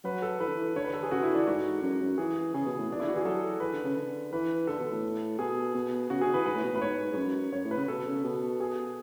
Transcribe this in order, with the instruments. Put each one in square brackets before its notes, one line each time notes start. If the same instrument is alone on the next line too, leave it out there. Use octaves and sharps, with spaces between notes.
[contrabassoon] F#3 [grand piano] B4
[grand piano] A4
[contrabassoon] E3 [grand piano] B4
[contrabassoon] D3
E3
[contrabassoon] D3 [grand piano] C#5
[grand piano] B4
A4
G#4
[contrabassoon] C#3 [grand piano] F#4
[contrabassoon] D3 [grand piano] E4
[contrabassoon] E3 [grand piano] D4
[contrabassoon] G#2 [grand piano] F#4
[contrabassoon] F#2
F#2
[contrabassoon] E3 [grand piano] G#4
[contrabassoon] C#3 [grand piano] G#4
[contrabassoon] B2
A2
[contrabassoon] B2 [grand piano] D4
[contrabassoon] E3
[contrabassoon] D3 [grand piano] E4
[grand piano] F#4
[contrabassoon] E3 [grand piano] G#4
[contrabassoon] F#3 [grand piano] A4
[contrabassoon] E3 [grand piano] B4
[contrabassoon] D3
C#3
D3
[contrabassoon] E3 [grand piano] B4
[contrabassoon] D3 [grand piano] A4
[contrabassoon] B2
A2
[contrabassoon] B2 [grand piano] G#4
[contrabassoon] B2
[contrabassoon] C#3 [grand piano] F#4
[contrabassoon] D3 [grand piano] G#4
[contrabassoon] E3 [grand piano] B4
[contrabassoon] G#2 [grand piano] B4
[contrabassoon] A2
B2
[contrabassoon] A2 [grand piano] B4
[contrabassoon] G#2 [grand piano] C#5
[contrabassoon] G#2
F#2
[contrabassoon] F#2 [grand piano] C#5
[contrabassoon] A2
[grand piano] B4
[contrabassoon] C#3
[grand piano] B4
[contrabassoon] B2 [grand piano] A4
[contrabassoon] C#3
B2
[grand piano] G#4